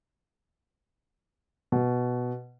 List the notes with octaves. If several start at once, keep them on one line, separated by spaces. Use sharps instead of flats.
B2